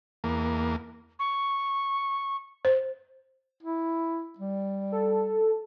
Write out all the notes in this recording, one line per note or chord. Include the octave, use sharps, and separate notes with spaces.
E2 A#3
C#6
C5
E4
G3
A4